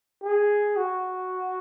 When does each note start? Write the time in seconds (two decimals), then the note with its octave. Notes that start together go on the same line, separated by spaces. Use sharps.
0.23 G#4
0.77 F#4